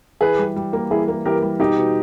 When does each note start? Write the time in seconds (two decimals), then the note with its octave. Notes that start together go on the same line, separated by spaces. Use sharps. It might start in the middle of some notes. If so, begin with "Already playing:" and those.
0.21 E3 G#4 B4
0.39 G3
0.56 G3
0.73 A#3
0.91 E3 E4 G#4
1.08 A#3
1.25 E3 G4 A#4
1.42 G3
1.59 B2 D#4 G4
1.77 B2